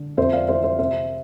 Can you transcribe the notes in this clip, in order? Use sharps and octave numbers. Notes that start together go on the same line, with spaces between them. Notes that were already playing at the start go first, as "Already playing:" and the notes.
Already playing: D3
F2 C5 E5
D5 F5
E3 C5 E5
C5 E5
C3 C5 E5